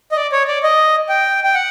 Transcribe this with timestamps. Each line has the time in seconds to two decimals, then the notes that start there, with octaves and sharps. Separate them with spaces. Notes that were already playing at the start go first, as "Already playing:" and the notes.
0.12 D#5
0.16 D5
0.32 C#5
0.48 D5
0.63 D#5
1.09 G5
1.44 G5
1.54 F#5